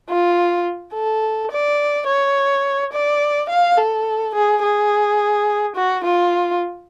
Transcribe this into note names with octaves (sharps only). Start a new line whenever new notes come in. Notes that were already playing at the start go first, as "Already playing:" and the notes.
F4
A4
D5
C#5
D5
F5
A4
G#4
G#4
F#4
F4